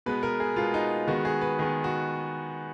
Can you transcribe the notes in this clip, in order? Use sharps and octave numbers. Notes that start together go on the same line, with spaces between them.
B2 G#3 B3 B4
A#4
G#4
B2 G#3 B3 F4
D#4
D#3 G#3 B3 F#4
G#4
B4
D#3 G#3 B3 G#4
F#4